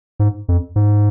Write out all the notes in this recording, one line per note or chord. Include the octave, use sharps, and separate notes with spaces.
G#2
F2
G#2